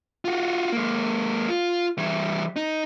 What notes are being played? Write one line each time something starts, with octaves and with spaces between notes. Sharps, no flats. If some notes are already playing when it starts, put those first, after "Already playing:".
F4 F#4
G#3 A#3
F4
E3 G3
D#4